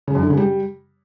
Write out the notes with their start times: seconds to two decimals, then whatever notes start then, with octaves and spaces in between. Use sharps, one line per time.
0.07 C#3
0.15 F#2
0.22 D3
0.30 C#3
0.37 G3